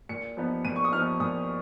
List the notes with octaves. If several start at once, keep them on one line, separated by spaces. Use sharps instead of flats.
A#2 C#7
F3 B3 D#4
A#2 D#7
C#6
D#6
F3 B3 D#4 F6
A#2 D#6